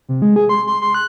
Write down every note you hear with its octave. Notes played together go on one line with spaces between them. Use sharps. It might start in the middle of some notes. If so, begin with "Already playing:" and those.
C3
G#3
G#4
C6
C6
C6
F#6